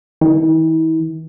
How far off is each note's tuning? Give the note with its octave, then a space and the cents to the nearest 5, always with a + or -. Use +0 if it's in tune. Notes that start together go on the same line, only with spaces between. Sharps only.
E3 -45